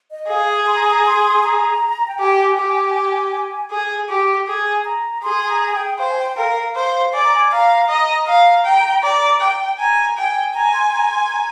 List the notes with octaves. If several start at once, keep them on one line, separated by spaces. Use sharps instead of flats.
D#5
G#4 F5
G#5
C6
A#5
G#5
A#5
C6
A#5
G5
G4 G#5
G4
G#4
G4
G#4 G#5
A#5
G#4 C6
G#5
A#5
G#5
G5
C5 F5
G#5
G5
A#4 F5
F5
C5 F5
D5 G#5
A#5
G#5
F5 A#5
D#5
F5 A#5
G5
D5
G5
G#5 A#5
G5 G#5
G#5 A#5
C6
A#5
C6
A#5